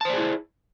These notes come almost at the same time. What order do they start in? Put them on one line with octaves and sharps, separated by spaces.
A5 C5 D5 G#4 E4